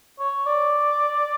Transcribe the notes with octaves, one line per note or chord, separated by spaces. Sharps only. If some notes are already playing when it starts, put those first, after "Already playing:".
C#5
D5